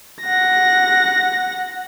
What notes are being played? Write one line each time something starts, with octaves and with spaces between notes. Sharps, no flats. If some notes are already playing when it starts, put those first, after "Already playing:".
F#5 A#6